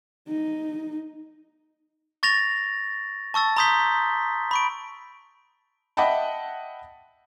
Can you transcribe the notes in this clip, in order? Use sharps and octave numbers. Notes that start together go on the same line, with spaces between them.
D#4
C#6 A6 A#6 F7
A5 C#6 E6 A6
A#5 C6 D#6 G6 B6 G7
B5 C#6 D7
D#5 E5 F#5 G5 A5 B5